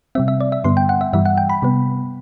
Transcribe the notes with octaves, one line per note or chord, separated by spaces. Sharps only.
C3 G3 C4 E5
E5
D5
E5
G2 D3 G3 B3 C6
G5
F#5
E5
G2 E3 G3 E5
F#5
G5
B5
C3 G3 B3